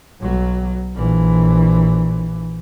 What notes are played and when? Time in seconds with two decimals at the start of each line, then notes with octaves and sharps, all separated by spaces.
0.21 B1 F#3
0.96 A#1 E3